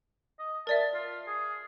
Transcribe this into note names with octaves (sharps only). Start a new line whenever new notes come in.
D#5
A#4 D5 E5 A5
F4
G#4